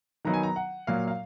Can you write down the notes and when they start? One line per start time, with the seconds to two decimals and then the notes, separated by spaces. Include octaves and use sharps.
0.25 D#3 F#3 B3 D#4 A#5
0.34 G#5
0.43 A#5
0.56 F#5
0.87 A#2 F#3 A#3 F5
1.08 F5